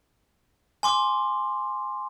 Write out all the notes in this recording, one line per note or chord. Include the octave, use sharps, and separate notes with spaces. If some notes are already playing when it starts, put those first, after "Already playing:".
G#5 C6 D6